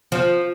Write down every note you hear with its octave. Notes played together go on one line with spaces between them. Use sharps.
F3